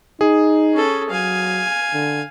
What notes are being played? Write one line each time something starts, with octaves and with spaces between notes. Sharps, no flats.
D#4 G#4
C#4 A4
F#3 F5 G#5
D3